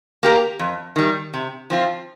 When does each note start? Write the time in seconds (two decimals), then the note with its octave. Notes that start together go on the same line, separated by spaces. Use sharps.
0.23 A#3 G4 A#4
0.59 F2
0.96 D#3 G3
1.34 C3
1.70 F3 C4 F4